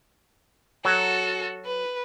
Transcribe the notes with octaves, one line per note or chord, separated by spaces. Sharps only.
F#3 F#4 A4
B4